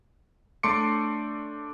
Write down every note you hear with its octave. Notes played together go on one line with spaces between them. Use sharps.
A3 D4 C6 D6 C#7